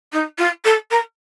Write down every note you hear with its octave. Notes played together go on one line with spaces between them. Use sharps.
D#4
F4
A4
A#4